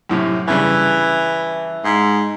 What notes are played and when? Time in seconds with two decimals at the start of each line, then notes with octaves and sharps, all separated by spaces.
0.09 F#2 A2 C3
0.48 G2 C#3 E3 G3
1.85 G#2